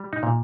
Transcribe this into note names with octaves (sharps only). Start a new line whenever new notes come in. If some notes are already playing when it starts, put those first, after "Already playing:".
Already playing: G3
D#4
A#2